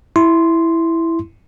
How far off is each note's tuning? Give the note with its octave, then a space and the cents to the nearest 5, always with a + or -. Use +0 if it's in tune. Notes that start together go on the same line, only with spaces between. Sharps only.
E4 +0 C6 -5